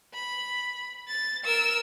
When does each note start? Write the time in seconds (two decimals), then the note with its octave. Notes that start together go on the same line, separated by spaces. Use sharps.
0.13 B5
1.08 A6
1.44 A#4 E6